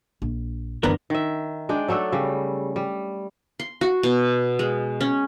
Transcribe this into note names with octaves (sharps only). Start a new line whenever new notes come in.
A#1
F#2 D3 E3 B3 A#4
D#3 E5
G#3 D4 D5 G5
F#3 A3 D4 A4
C#3 G3
G3
C6
F#4
B2
G#3
C#4